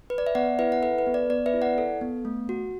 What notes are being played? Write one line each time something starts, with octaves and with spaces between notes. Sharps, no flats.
B4
D5
E5
B3 D5 F#5
E4 B4 E5
F#5
A4 B4 E5
B4
B3
D5
B3 D5
B4 E5
E4
D5 F#5
A4
B3
A3
F#4